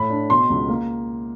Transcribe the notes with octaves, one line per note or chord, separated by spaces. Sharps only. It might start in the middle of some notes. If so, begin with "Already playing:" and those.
Already playing: A2 B5
D4
B2 C6
C#2
A#3